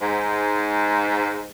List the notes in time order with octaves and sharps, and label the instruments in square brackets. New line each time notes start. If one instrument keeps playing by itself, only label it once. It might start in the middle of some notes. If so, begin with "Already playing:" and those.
[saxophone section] G#2